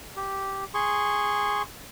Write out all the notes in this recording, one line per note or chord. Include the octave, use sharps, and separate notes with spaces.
G4
G#4 C6 C#6